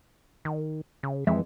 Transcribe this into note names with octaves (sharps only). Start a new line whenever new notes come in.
D#3
C#3
F2 E3 G#3 E5